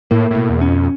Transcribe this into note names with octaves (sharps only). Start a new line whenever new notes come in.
A2 A#3
A2
B2
E2
C#4
F2